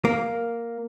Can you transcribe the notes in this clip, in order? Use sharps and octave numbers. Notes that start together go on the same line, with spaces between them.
A#3